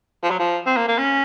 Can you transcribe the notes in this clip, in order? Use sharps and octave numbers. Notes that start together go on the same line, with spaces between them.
F3
F#3
F3
C4
A#3
A#3
C#4